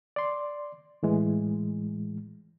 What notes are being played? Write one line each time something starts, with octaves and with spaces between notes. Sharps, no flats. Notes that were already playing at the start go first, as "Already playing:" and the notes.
D5 C6
A2 E3 G#3